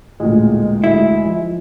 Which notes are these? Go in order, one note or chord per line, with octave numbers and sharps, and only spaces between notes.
A1 D2 A#2 G#3
D2 E4
F3